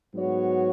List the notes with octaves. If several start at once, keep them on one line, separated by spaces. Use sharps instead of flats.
G#2 F#3 B3 F#4 C#5